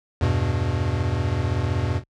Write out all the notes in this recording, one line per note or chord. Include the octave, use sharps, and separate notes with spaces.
E2 G2 B2